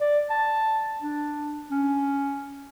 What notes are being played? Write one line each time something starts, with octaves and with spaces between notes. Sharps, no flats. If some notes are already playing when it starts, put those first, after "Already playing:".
D5
A5
D4
C#4